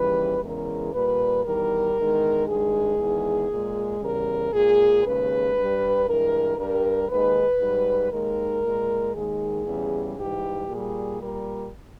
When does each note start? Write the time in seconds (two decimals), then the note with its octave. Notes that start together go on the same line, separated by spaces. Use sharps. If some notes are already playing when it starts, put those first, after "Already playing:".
Already playing: D#2 C#3 E3 G3 B4
0.42 E2 C#3 E3 G#3 A#4
0.93 A#2 G3 B4
1.44 E2 D#3 G3 A#4
1.96 E2 D#3 G#3
2.47 G2 D#3 G#3 G#4
2.98 E2 D#3 G#3
3.50 A#2 G#3
4.01 E2 C#3 G3 A#4
4.53 A#2 G#3 G#4
5.03 D#2 C#3 G#3 B4
5.55 G2 G3
6.06 G2 E3 G#3 A#4
6.57 G2 G3 A#4
7.09 D#2 D#3 G#3 B4
7.60 G#2 G3
8.11 D#2 D#3 G#3 A#4
8.64 A#2 G#3
9.14 D#2 D#3 G#3 G#4
9.65 E2 C#3 G3
10.17 G#2 E3 G3 G4
10.68 A#2 G3 G#4
11.20 A#2 G3 A#4